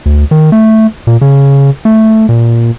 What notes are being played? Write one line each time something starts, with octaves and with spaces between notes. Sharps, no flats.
D2
D#3
A3
A#2
C#3
A3
A#2